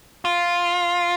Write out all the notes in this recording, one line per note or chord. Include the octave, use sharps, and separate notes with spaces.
F4